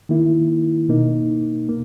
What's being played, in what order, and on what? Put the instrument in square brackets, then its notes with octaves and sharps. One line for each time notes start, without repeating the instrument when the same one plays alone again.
[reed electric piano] D#3 A#3 E4
B2 A#3 D#4
A#3